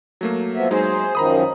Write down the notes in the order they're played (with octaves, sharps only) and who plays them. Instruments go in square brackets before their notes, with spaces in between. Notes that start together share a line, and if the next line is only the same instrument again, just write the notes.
[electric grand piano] F#3 A3 A#3
[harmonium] F3 B3 E5
[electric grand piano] F#3 G#3 D#4 [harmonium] G#4 C5
[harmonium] F#2 D#3 F3 [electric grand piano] A#5 B5 D#6